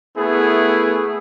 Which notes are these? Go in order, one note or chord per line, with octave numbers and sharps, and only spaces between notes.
A3 B3 E4 G#4